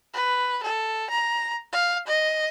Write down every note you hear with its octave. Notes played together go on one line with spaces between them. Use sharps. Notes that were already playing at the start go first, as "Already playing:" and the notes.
B4
A4
A#5
F5
D#5